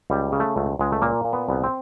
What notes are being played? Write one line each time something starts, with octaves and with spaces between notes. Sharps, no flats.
C#2 G3
C#3
A3
C#2
C#2 G#3
A3
A#2 A#3
A#2
B3
C2
C4